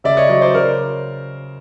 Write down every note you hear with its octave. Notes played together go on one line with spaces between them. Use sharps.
C#3 D5 E5
C#5 D#5
F#3 C#5 D#5
C5 D5
C#3 A#4 C5